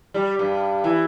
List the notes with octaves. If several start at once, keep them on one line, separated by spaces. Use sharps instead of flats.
G3
G2
E3